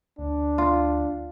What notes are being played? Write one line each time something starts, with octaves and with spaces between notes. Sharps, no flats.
D2 D4
F4